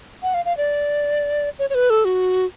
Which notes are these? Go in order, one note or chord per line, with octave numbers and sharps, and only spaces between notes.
F#5
F5
F5
D5
C#5
C#5
B4
A4
F#4